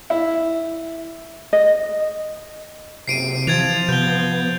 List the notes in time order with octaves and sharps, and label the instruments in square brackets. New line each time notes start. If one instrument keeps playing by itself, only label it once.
[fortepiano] E4
[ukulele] D#5
[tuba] F#1 [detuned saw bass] C3 [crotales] C7 D7 D#7
[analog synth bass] E3 [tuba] F3 [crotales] G#6 A6 F7
[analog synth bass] C3 [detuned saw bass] B3 [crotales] G6 G7